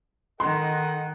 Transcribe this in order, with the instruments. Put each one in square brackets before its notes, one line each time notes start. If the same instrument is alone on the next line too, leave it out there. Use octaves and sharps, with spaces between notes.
[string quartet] D#3 [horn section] A4 D#5 F#5 [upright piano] C6